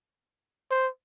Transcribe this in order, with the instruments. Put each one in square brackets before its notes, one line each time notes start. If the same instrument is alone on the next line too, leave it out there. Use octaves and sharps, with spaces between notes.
[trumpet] C5